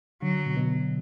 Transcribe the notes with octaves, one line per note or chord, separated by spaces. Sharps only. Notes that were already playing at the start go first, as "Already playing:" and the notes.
D3 F#3
B2
B2